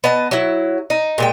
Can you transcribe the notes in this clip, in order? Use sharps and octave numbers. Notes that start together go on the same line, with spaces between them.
B3 D#5 A5
F#3 E4
D#4
A#2 G#3 G5